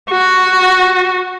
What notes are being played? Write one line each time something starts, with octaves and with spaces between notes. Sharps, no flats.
F#4